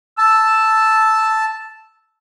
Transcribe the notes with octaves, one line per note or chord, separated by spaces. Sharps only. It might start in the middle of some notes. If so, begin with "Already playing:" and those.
A5 E6